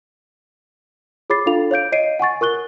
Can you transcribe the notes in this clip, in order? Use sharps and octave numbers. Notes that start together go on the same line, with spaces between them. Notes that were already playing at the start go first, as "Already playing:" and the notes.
G#4 C#5 B5 D6 A6 C7
D4 F4 A4 F5 F7
C#5 F5 G6 D7
C#5 D#5 C7 D7 D#7
F#5 G#5 C#6 A6
A#4 C#6 F#6 G7